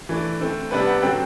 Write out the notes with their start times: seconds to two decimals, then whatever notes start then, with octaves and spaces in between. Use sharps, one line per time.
0.09 E3 A3 D4
0.40 D3 A3 C4
0.71 C3 G3 B3 D4 B4
0.87 F#5
1.03 D3 F#3 C4 G5